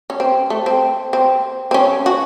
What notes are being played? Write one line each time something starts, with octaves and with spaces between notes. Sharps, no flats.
C#4
C4
A3
C4
C4
C4
C#4
F#4